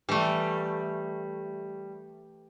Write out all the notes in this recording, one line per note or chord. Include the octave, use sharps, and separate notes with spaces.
E3 G3 A3